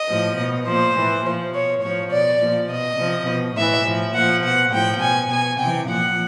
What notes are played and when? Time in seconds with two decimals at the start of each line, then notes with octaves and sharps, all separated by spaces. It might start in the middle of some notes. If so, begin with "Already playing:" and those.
Already playing: D#5
0.10 A2 F3
0.38 B2
0.67 A#2 F3 C5
0.96 A2 E3
1.25 A#2 F3
1.54 B2 C#5
1.83 A2 F3 C#5
2.12 B2 D5
2.41 A#2 F3
2.70 B2 D#5
2.99 C3 F3
3.29 B2
3.57 A2 E3 E5
3.85 A2 F3
4.14 A#2 F3 F#5
4.44 B2 F#5
4.73 A2 F3 G5
5.01 B2 G#5
5.31 B2 G#5
5.60 C3 E3 G5
5.89 A#2 F3 F#5